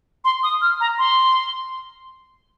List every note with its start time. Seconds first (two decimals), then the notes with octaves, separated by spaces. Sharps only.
0.25 C6
0.43 D#6
0.62 F6
0.80 A#5
0.98 C6